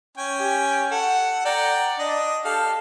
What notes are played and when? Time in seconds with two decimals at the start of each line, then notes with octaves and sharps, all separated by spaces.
0.17 C#4 G5 G#5
0.40 G4
0.91 A4 F#5
1.45 D5 F#5 G5 A#5
1.99 D4 D#5
2.45 G4 A4 F5